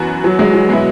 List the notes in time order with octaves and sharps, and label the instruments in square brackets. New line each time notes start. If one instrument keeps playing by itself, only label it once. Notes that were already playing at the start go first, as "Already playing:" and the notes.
Already playing: [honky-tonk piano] F#2 E3 B3 F#4
[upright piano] F#3
G#3
F#3
[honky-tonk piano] B2 G#3 B3 E4